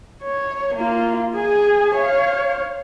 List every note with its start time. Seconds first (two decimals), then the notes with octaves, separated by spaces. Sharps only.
0.23 C#5
0.75 A#3 F4
1.35 G#4 G#5
1.95 C#5 F5